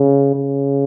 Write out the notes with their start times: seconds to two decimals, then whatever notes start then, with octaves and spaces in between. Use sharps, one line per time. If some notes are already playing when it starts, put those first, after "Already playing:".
Already playing: C#3
0.35 C#3